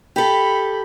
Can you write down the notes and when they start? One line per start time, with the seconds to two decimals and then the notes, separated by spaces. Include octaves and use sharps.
0.16 G4 A4 B5